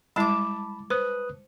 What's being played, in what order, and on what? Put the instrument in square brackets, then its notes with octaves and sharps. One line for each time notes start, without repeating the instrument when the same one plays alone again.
[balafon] G3 G#3 E4 [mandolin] A5 D6 [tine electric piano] B5
[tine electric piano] B4 D#6 F#6 [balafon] C5